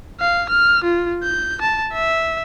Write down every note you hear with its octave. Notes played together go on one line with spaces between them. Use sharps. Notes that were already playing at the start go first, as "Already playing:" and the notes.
F5
F6
F4
G6
A5
E5